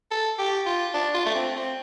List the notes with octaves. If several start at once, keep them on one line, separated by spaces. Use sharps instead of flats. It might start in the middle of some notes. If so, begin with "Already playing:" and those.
A4
G4
F4
D4
F4
A3
C4
C4